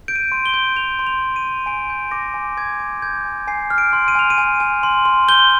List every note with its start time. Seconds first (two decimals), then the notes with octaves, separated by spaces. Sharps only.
0.08 G6 D7
0.16 D#7
0.32 C6
0.46 G7
0.54 G6
0.76 G6 F7
0.99 C6
1.07 F7
1.22 G6
1.36 D#7
1.45 C6
1.66 G#5 D7
1.90 G6
2.11 D6 A#6
2.34 G#5
2.57 D6 G#6
2.80 D6
3.02 G6 G#6
3.25 G#5
3.48 G#5 C7
3.70 F6
3.78 D7
3.93 C6
4.08 D#7
4.15 G#5 F7
4.30 D#7
4.38 G#5
4.60 G#5
4.83 C6
5.05 C6
5.28 G6 G7